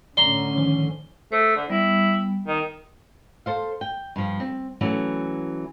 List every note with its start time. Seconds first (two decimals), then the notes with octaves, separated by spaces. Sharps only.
0.17 A2 D3 C#4 D5 A#5 C6
0.58 D#3 F3 C5
1.32 A3 C5
1.56 D3
1.70 G3 B3 E4
2.48 D#3
3.46 A4 C5 F5
3.81 G5
4.16 G2 F3
4.40 C4
4.81 E3 F#3 A3 C#4